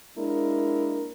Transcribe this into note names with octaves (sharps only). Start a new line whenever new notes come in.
G#3 A#3 D4 E4 A#4